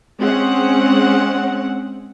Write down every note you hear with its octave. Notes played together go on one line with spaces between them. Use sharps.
G#3 C4 C#4 F#5